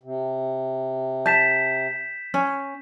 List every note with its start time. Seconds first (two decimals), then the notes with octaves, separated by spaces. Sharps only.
0.03 C3
1.26 A5 G6 B6 E7
2.34 C#4